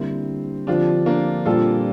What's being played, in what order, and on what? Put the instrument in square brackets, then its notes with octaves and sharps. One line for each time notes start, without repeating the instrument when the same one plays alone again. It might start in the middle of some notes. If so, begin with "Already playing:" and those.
Already playing: [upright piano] D3 G3 A#3 E4 G4 [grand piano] C4
[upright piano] D3 F3 C4 G4 [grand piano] D4 F4
[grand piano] A#3 D4
[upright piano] A#2 G3 C4 G4 [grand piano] F4 A4